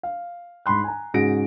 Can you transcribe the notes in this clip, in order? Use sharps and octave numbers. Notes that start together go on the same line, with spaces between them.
F5
G#2 B5 C6 F#6
G#5 A#5
G#2 C#3 F#4 G#4 A#6 D7